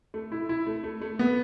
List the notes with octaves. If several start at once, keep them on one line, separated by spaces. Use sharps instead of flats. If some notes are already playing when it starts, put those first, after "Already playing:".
A3
E4
E4
A3
A3
A3
B3